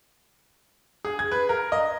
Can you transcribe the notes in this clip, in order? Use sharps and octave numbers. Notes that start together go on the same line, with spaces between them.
G#4
G#6
B4
A#4
D#5